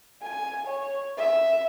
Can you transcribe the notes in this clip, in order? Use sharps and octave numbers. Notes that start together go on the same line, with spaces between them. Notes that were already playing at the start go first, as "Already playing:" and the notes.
G#5
C#5
E5